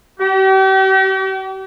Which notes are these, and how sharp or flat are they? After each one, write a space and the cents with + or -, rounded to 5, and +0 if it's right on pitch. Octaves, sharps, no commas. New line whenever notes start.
G4 -40